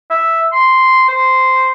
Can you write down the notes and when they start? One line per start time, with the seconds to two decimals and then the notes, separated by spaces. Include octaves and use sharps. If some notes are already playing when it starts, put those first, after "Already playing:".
0.10 E5
0.52 C6
1.08 C5